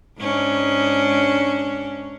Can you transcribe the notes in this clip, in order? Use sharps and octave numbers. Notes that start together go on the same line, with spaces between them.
G#2 C#4 D4